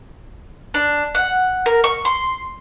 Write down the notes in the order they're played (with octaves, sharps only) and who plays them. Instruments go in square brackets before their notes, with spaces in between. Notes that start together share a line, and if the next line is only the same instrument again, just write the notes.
[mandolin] D4
F#5
A#4
C#6
C6